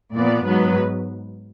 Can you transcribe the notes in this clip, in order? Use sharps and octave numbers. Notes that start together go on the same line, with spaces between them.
A#2 F3 B3 D5
G#2 F#3 B3 B4